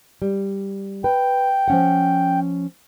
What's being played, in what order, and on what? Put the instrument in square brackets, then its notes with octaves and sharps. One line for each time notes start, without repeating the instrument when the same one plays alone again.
[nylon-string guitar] G3
[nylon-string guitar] B4 [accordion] G5
[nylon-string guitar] F3 C#4 F#5